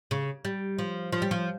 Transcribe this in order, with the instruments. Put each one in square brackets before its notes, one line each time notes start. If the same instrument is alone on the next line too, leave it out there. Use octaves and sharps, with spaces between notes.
[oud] C#3
G3
F3
F3
G3
F3